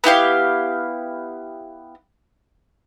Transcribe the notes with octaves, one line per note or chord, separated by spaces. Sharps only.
B3 E4 G4 F5